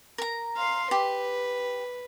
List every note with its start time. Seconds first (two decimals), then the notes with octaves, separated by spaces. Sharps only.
0.18 A#4 A#5
0.56 F5 C6
0.91 G4 B4